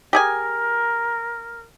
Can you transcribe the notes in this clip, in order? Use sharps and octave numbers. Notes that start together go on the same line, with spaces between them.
G4 G#4 A#4 G#5